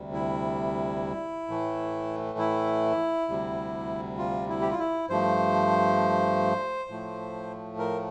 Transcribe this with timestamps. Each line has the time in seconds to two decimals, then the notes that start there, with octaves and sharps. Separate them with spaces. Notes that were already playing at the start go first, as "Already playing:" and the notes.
Already playing: D2 C3 G3
0.13 E4
1.48 A2 E3 A3
2.39 E4
3.28 D2 C3 G3
4.18 F4
4.49 E4
4.61 G4
4.70 F4
4.79 E4
5.09 G2 F3 A3 C5
6.89 A2 F3 A3
7.79 A#4